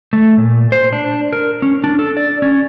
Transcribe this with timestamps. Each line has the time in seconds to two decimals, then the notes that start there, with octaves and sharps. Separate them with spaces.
0.13 A3
0.37 A#2
0.72 C5
0.93 D4
1.33 A#4
1.62 C#4
1.84 D4
1.99 A4
2.17 D5
2.42 C#4